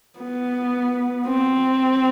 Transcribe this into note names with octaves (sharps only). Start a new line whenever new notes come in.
B3
C4